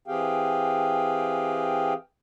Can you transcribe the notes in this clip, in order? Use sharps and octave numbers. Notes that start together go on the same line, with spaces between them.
E3 C4 G4 G#4 F5 G5